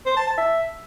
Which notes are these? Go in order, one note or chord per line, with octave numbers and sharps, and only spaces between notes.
C5
A5
A5
E5